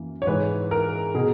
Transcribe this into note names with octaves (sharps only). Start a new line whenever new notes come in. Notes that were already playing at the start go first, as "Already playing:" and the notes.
Already playing: F#2 E3 A#3
C#5
G#2 E3 G#3 B4
A#4
B2 G#4